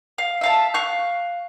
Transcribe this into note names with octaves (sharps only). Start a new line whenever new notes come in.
F5
E5 F5 A5
F5 C#6 F#6